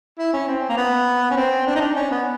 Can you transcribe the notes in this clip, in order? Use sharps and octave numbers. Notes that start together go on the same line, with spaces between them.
E4
C#4
C4
A#3
B3
C#4
C4
D4
D#4
D4
C#4
B3